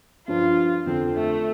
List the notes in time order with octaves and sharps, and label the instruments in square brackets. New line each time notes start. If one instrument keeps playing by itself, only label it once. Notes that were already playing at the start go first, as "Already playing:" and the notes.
[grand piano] G2 F3 D4 [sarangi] F4
[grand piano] F2 D3 F3 [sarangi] C4
[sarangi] A3